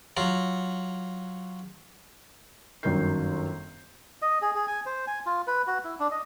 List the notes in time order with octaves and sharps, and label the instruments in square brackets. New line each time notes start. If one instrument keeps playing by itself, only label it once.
[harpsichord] F#3 F4
[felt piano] G1 F#2 D#3 A#4 G6 C7
[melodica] D#5
G#4
G#4
G#5
C5
G#5
F4
B4
F#4
E4
D4
D#5